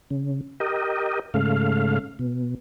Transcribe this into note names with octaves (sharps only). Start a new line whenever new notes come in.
C#3
G4 A#4 D#5
G#2 C#3 A3 F5
B2